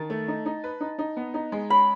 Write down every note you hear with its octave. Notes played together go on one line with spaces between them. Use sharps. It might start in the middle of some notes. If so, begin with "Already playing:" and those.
Already playing: D#3 A5
A3
D#4
D#4
B4
D#4
D#4
B3
D#4
G#3
C#4 B5